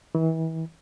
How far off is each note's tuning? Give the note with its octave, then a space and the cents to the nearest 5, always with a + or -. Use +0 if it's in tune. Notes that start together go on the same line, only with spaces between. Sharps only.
E3 -35